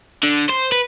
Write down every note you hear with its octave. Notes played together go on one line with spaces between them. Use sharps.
D3
C5
B4